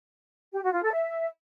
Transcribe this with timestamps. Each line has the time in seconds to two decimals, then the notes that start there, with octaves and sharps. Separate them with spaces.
0.53 G4
0.63 F#4
0.73 F4
0.83 A4
0.93 E5